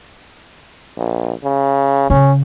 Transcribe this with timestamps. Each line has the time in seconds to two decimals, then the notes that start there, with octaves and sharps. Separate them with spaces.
0.97 A#1
1.44 C#3
2.10 C#3 C#4